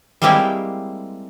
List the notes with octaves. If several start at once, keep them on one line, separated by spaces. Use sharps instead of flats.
G3 G#3 A#3 C4 E4 G4